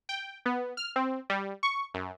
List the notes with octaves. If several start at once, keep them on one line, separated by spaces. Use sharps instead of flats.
G5
B3
F6
C4
G3
C#6
F#2